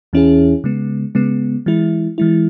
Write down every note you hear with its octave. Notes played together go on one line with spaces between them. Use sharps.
E2 E3 C#4 E4 G#4
C#3 G#3 B3
C#3 G#3 B3
E3 G#3 E4
E3 G#3 E4